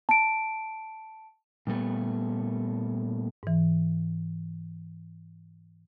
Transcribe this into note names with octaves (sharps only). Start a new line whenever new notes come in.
A5 D7
A#2 G3 A3 B3
G#2 E3